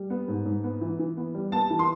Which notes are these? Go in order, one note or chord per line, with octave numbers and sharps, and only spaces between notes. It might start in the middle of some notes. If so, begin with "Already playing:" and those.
Already playing: G3
B3
G#2
G#2
B3
E3
E3
B3
G3
B3 A5
E3
C6